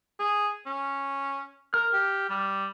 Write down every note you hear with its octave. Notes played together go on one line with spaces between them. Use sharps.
G#4
C#4
A#4 F6
G4
G3